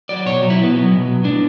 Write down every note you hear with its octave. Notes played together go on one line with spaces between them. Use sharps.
F#3 D5
B2 C#5
F#3
E4
B2 B3
F#3
B2
F#3
A2 D4